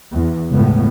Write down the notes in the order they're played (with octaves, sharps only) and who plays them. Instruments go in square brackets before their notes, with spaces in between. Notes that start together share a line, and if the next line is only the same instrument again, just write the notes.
[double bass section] E2
G1 C#2 A2 B3